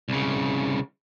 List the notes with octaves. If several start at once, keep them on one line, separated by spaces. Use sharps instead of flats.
C2 C#3